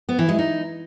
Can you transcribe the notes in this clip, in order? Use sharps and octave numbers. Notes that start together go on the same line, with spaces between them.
B3
E3
G#3
D#4